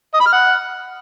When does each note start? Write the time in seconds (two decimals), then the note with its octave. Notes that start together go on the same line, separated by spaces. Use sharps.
0.14 D#5
0.20 B5
0.26 F6
0.33 F#5